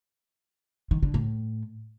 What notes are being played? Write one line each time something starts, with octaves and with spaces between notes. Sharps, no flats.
D#3
D3
A2